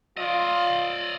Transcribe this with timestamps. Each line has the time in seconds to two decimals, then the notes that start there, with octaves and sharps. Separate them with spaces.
0.17 F4 D5 D#5